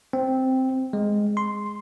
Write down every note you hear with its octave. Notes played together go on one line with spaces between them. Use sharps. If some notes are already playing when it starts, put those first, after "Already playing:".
C4
G#3
C6